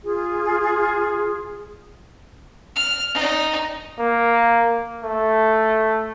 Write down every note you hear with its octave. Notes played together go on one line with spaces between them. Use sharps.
F4 G#4
F6
D#4
A#3
A3